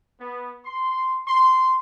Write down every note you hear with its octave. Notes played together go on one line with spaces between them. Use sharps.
B3
C6
C6